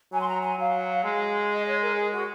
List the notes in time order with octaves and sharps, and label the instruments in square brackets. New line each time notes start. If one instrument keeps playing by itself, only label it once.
[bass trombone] F#3 [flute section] G#5
[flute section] C6
A#5
G#5
[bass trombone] F#3 [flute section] F5
[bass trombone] G#3
[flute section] D#5
C#5
A#4
G#4
F#4